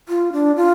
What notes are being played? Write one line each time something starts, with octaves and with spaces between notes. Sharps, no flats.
F4
D4
F4